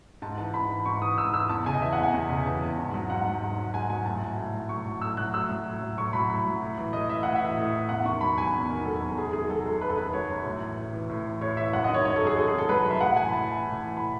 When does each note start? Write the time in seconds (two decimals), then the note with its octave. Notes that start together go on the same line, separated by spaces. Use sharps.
0.22 G#2 A5
0.38 E3 A5
0.53 G#2 B5
0.70 E3
0.86 G#2 C#6
1.02 E3 D#6
1.18 G#2 E6
1.33 E3 E6
1.49 E2 A5
1.66 C#3 G#5
1.74 D#5
1.82 E3 E5
1.93 F#5
1.98 E2
2.03 G#5
2.14 E2
2.30 C#3
2.46 E3 A5
2.62 E2
2.78 G#2
2.94 F#3
3.10 G#2 F#5
3.26 F#3
3.42 G#2
3.58 F#3
3.74 G#2 G#5
3.90 F#3 G#5
4.06 A2 A5
4.21 F#3
4.38 A2
4.54 F#3
4.69 A2 C#6
4.85 F#3
5.01 A2 E6
5.17 F#3 F#6
5.34 A2 E6
5.49 F#3
5.66 A2
5.81 F#3
5.97 A2 C#6
6.13 F#3 B5
6.30 A2
6.46 F#3
6.62 A2
6.78 E3
6.93 A2 D#5
7.09 E3 E5
7.23 A2 F#5
7.36 E5
7.41 E3
7.57 A2
7.74 E3
7.89 E2 F#5
8.05 D#3 C#6
8.21 F#3 B5
8.37 E2 G#5
8.53 E2
8.69 D#3
8.85 F#3 A4
9.01 E2
9.17 F#2 G#4
9.33 D#3 G#4
9.49 F#3 A4
9.66 F#2 A4
9.81 F#2 B4
9.89 A4
9.97 D#3 B4
10.13 F#3 C#5
10.29 F#2
10.46 A2
10.61 E3
10.77 A2
10.93 E3
11.09 A2
11.25 E3
11.41 A2 C#5
11.57 E3 E5
11.73 F#2 F#5
11.84 D#5
11.89 D#3
11.94 C#5
12.05 F#3 C#5
12.16 A4
12.21 F#2
12.27 G#4
12.37 F#2 A4
12.48 G#4
12.53 D#3
12.58 A4
12.69 F#3 B4
12.85 F#2
12.91 E5
13.01 A2 F#5
13.17 E3 G#5
13.29 B5
13.33 A2 A5
13.49 E3
13.65 A2
13.81 E3
13.97 A2 B5